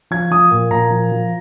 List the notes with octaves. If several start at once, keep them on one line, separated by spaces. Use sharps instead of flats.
F3 G#6
F3 D#6
A#2
A#2 A#5
F3
F3